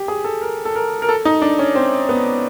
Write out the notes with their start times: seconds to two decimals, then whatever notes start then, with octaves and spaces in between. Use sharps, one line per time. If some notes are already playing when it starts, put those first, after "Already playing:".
Already playing: G4
0.08 G#4
0.24 A4
0.41 A#4
0.65 A4
0.75 A#4
1.02 A#4
1.09 A4
1.25 D#4
1.42 D4
1.59 C#4
1.75 C4
2.09 B3